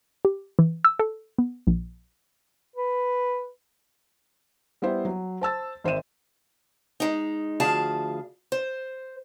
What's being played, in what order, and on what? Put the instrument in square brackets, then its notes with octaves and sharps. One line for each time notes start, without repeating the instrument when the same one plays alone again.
[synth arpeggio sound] G4
E3
E6
A4
B3
A#1
[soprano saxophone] B4
[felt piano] G3 B3 E4 C5 E5
F#3
C5 A5 E6 A6
G#1 C5 E5 D#7 E7
[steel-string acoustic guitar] G#3 D#4
D2 F3 G#4 F5 A5
C5